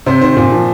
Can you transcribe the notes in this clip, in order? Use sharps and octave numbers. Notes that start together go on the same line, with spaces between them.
C3 C5
D#3 C5
A#2
F3